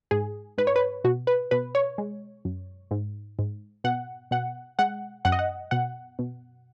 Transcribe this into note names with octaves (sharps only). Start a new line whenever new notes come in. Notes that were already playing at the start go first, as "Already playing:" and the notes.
G#2 G#4
G#2 B4
C#5
B4
B2 F#4
B4
B2 B4
C#5
G#3
F#2
G#2
G#2
B2 F#5
B2 F#5
G#3 F#5
F#2 F#5
D#5
F#5
B2 F#5
B2